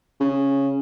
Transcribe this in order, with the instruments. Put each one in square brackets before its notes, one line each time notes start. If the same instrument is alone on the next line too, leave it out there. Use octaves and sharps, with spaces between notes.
[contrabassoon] C#3